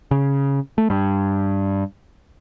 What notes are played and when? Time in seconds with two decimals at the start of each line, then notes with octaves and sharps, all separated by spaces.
0.11 C#3
0.78 A3
0.90 G2